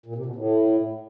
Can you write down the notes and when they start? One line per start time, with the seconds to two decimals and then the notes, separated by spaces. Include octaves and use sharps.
0.06 A#2
0.16 C3
0.26 B2
0.35 A2